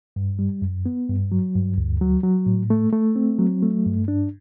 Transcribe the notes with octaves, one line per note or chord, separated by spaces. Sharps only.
G2
G3
F#2
B3
G2
F#3
G2
D2
F#3
F#3
A2
A3
A3
C4
F#3
A3
G2
D4